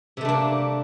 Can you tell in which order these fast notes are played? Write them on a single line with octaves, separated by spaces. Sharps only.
C3 A3 D4 A#3